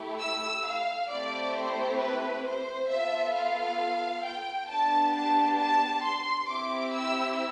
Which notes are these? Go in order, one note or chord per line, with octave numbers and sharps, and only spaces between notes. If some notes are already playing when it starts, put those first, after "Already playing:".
Already playing: A3 E4 G4
E6
F5
A3 C4 E4 G4 D5
C5
B4
C5
B3 F4 A4 E5
F5
G5
B3 D4 G4 A5
A5
A5
C6
C4 E4 G4 D6
E6